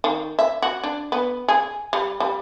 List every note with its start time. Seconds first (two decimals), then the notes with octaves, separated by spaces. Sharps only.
0.04 D#3
0.39 E5
0.62 F#4
0.83 D4
1.12 B3
1.48 G#4
1.93 G3
2.20 G3